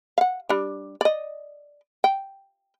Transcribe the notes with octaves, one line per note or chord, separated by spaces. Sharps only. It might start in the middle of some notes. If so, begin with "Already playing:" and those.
F5 F#5
G3 D4
D5 D#5
G5